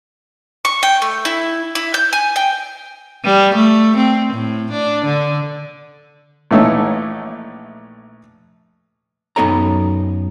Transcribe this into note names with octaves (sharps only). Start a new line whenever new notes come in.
C#6
G5
A3
E4
E4
G6
G#5
G5
G3
A3
C4
A2
D4
D3
A#1 E3 A3 D#4 C#5 A5
F#2 B3 D#4 A4 C#5 A#5